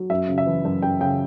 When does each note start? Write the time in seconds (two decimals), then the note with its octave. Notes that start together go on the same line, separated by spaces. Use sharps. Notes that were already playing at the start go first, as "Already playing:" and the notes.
Already playing: F#3
0.10 F#2 E5
0.28 C#3
0.38 E5
0.46 E3
0.65 F#2
0.82 F#2 G5
1.01 C#3 G5